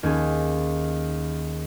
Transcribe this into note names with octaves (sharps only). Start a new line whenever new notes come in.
D#2 C#4 G#4